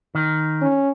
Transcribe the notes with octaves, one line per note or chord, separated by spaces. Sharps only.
D#3
C#4